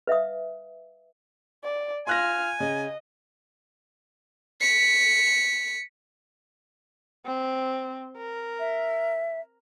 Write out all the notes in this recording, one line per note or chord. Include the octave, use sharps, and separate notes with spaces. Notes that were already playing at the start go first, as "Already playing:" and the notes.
B4 E5 F5 D#6
D5
F4 G#5 C6 F6 F#6 A#6
C#3 D#5
B6 C#7
C4
A#4
E5